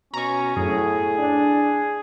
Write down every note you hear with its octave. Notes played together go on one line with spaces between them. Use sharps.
B2 C#4 A#5 C#6
F#2 A2 G#4
D4